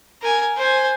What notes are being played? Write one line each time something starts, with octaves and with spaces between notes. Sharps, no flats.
A#4 G#5
C5 G#5